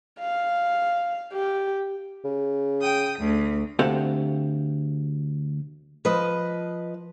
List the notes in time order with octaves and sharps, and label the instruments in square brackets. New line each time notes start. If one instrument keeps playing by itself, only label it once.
[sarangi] F5
G4
[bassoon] C#3
[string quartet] G5 D#6
D2
[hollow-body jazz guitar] D2 C4 G4 A4 F5 F#5
[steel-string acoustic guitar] F3 B4 D#5